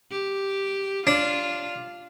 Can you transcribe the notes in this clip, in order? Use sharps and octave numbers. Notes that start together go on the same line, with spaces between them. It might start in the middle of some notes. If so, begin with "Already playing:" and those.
G4
D4 F4